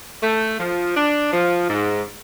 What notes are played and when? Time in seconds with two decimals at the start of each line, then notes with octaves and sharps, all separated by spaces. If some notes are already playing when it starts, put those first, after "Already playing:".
0.23 A3
0.60 F3
0.97 D4
1.33 F3
1.70 G#2